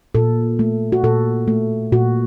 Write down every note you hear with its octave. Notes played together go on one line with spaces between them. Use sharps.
A#2 A4
A3
F#4
A#2 A4
A3
A#2 F#4